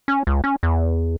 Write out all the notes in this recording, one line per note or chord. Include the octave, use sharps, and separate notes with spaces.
C#4
C#2
C#4
E2